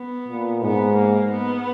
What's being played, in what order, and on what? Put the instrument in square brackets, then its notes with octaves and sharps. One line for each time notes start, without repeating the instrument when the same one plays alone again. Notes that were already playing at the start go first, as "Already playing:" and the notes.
Already playing: [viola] B3
[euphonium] A#2
[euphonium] G#2 [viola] B3
[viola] A#3
B3